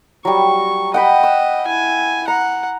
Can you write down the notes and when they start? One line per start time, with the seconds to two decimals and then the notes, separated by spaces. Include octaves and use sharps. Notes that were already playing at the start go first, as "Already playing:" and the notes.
0.25 F#3 G3 C#6
0.94 D#5 F#5 G5 B5
1.23 E6
1.66 E4 G#5
2.28 F#5 A#5